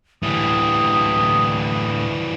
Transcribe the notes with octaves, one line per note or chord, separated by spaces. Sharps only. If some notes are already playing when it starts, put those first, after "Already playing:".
A2 D3 E3 G3 D#6